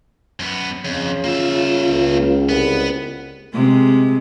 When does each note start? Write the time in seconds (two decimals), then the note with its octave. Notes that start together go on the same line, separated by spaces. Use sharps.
0.40 F#2 B3
0.85 F2 C#3
1.24 A#3 F4 E5
1.89 C#2
2.49 C2 B3
3.54 C3 G#3